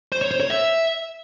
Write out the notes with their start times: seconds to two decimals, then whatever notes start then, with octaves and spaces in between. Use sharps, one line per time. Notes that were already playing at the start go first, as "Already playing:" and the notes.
0.12 C5
0.22 C#5
0.31 C5
0.40 C#5
0.50 E5